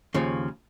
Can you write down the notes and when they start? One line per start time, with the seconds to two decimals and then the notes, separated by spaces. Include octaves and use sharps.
0.14 D#2 C#3 F3